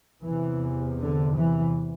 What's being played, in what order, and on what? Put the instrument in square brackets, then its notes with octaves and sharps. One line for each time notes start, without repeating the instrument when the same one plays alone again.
[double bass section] E2 C3 E3
D3
E3